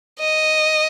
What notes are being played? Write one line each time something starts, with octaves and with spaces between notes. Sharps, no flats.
D#5